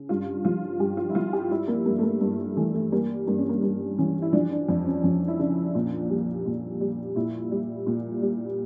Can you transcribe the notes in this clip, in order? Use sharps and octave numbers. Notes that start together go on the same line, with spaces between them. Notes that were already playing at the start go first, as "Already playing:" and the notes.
Already playing: C#3
G2 F4
F3 F4
G2 G4
F4
E4
F3 F4
G4
G3 E4
A#3
G2 A#3
A3
A#3
G2 A#3
E3 A3
A3
G3 A#3
G2 A#3
C#4
A#3
G2 A#3
E3 C#4
E4
F3 D4
D4
F2 D4
C#4
F2 C#4
E4
C#3 D4
A#2
G3
A#2
G3
A#2 E4
G3
A#2
G3